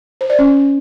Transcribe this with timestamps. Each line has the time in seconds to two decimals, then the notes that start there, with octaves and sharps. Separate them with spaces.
0.21 C5
0.30 D5
0.39 C#4